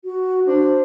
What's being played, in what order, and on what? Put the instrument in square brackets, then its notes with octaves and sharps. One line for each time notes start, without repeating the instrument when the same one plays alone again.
[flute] F#4
[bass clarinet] D4 [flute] C5